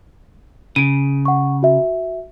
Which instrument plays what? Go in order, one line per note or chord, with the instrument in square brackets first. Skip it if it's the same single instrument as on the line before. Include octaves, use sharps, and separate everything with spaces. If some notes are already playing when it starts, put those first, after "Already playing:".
[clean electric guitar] C#3 [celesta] D7 D#7
[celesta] F#5 C#6
F#4 E5